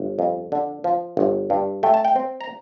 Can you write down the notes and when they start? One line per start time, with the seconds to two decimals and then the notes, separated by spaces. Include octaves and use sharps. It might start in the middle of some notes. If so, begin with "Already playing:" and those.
Already playing: G1
0.19 F2
0.52 D3
0.84 F3
1.17 G1
1.50 G2
1.83 A3 G5
1.94 A5
2.05 G5
2.16 C4
2.41 A#5